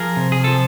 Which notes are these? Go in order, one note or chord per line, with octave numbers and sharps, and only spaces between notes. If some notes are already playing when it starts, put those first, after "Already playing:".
Already playing: F3 G#4 A#4
C3
G#4
F3 A4